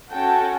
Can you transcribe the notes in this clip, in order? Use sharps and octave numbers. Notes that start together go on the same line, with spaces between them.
C#4 F#4 A4 G5 A5